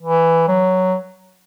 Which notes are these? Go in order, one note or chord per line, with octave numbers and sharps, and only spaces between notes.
E3
F#3